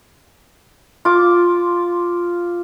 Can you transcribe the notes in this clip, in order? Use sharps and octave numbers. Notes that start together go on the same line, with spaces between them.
F4 D6